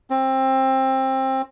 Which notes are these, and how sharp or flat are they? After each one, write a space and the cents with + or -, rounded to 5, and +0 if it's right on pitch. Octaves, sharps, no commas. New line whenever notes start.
C4 +20